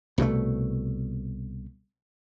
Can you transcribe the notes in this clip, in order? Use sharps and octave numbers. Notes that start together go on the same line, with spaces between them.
C2 B2 D#3 A3